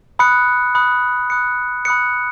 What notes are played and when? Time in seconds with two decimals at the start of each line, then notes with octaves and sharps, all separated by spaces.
0.19 B5 D#6 F#6 C#7
0.75 B5 D#6 F#6 C#7
1.30 B5 D#6 F#6 C#7
1.85 B5 D#6 F#6 C#7